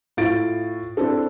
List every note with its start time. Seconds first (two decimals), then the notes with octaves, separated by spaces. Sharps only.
0.17 A2 E4 F4 A6 D7
0.97 C4 D4 E4 A4